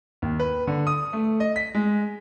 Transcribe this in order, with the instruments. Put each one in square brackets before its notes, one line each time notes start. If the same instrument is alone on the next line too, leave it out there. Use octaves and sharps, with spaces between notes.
[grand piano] D#2
B4
D3
D#6
A3
D#5
B6
G#3